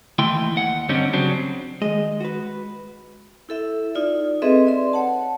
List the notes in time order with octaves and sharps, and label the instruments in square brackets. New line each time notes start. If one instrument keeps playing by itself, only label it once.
[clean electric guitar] D#2 E3 A3 E4 G5 C6
D#2 F#5
G2 D3 G3 C4 C#4 D#4
C#3 F#3 C4 D4
[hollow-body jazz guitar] D#3 D#5 [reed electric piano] G#3
[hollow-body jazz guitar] F#4 B4
[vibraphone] E4 A4 E5
D#4 F4 D5
C4 G#4 A4 B4 D#5 E5
D5 C6
C#5 F#5 A5